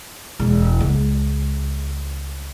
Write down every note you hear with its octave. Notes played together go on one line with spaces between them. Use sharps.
E1
C#2